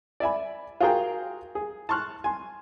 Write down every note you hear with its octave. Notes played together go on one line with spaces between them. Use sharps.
D5 E5 G#5 B5
F4 F#4 G#4 A#4 G5
G#4
A5 C6 C#6 F6 F#6
G#5 C6